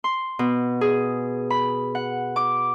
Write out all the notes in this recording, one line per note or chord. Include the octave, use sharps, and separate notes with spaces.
C6
B2
G#4
B5
F#5
D6